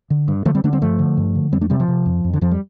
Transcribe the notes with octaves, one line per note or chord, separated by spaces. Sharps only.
D3
G2
D3 F3 A3
G3 C4
D3 A3 D4
G3 C4
G2 F3 A3
D3
G2
D3
F2 G3 C4
A3 D4
C3 G3 C4
F3
C3
F2
F2
D3
F2 F3
G3